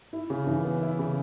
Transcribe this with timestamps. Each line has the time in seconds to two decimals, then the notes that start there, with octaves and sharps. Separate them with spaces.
0.13 E4
0.30 C#3
0.47 E3
0.65 B3
0.81 E4
0.99 C#3